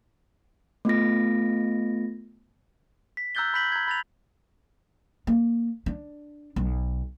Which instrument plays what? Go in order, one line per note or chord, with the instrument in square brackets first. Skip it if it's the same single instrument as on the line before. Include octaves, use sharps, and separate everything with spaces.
[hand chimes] A3 B3 F4 A#6
[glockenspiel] B6
A#5 E6 F#6 G6 A6 G7
B5 G6 B6 F#7
A#5 G#6
B5 A6 F7
[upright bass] A#3
D4
B1